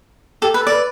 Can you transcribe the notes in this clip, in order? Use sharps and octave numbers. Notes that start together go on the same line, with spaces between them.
G4 A4
B4
A4
D5
B4